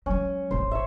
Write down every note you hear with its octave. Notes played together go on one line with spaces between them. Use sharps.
F#3 G#3 C#4
D1 G#1 C5
C#5 E5